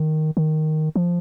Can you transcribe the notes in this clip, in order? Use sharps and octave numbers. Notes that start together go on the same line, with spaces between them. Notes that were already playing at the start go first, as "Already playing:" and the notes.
Already playing: D#3
D#3
F3